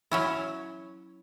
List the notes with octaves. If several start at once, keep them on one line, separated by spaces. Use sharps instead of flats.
F#3 C#4 E4